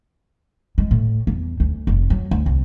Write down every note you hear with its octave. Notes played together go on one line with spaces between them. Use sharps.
G#3
A2
E2
D2
F1
F#3
D2
C2